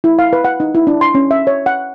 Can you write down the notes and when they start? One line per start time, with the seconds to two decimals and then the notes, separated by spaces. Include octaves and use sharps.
0.04 E4
0.19 F5
0.33 B4
0.45 F#5
0.60 D#4
0.75 E4
0.87 D4
1.01 C6
1.15 C#4
1.31 E5
1.47 C#5
1.66 F#5